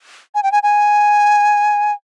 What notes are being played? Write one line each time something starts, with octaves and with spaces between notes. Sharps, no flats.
G#5
G5
G#5
G#5